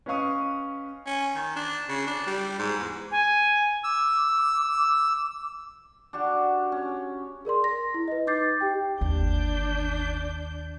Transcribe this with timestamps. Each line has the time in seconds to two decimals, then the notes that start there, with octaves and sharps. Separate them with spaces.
0.06 C#4 B4 D#5 F5 C#6 D#6
1.07 C#4
1.36 D#3
1.56 D4
1.89 C#3
2.07 D4
2.27 G3
2.59 G#2
2.79 E2
3.11 G#5
3.84 D6 E6
6.13 D4 F#4 G4 A5
6.72 C#4
7.45 G#4 A#4 D5 C6
7.64 A#6
7.94 E4
8.08 B4 D#5
8.27 D#4 D6 G6 A6 C7
8.61 G4 G5
9.01 G1 D#2 D4 G6